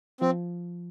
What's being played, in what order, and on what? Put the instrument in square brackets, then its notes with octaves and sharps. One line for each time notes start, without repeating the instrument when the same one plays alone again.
[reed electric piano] F3 [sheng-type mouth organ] C4